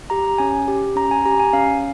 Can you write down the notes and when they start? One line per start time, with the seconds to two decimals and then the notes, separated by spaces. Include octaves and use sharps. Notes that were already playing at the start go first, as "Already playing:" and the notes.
0.10 G4 A#5
0.38 C#4 G#5
0.68 G4
0.96 C#4 A#5
1.11 G#5
1.25 G4 A#5
1.40 G#5
1.53 C#4 F5